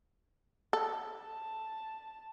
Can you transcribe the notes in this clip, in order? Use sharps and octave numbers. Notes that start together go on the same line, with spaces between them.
A4
A5